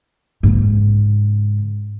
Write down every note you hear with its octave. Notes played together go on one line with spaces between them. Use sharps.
G#2 C#3